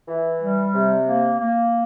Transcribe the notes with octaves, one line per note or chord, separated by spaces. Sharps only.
E3
G3
C3
A#3
A#3